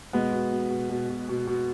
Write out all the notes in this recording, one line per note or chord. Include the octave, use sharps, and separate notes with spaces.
B2 G#3 B3
B2
B2
B2
B2
B2
B2
B2